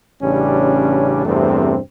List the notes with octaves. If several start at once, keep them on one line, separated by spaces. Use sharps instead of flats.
A1 C#3 G3 C#4 D4
E2 G2 C3 A3 C4